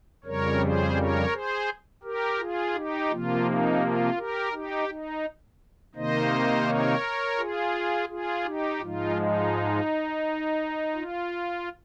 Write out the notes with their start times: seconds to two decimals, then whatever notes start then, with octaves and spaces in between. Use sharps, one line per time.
0.24 F2 C#3 G3 A#4 C#5
0.60 G#4 C5
0.96 A#4 C#5
1.32 G#4 C5
2.03 G4 A#4
2.39 F4 G#4
2.74 D#4 G4
3.10 C3 F3 A#3 F4
3.45 D#4
3.81 F4
4.16 G4 A#4
4.52 D#4 G4
4.88 D#4
5.95 C3 D#3 A#3 D#4 C5 D#5
6.66 A#4 C#5
7.38 F4 G#4
8.09 F4 G#4
8.44 D#4 G4
8.80 G#2 F3 G#3 D#4 F4
9.16 D#4
10.94 F4